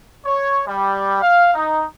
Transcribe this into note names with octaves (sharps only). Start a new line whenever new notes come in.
C#5
G3
F5
D#4